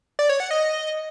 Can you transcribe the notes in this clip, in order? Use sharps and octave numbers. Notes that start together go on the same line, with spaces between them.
D5
C#5
F#5
D#5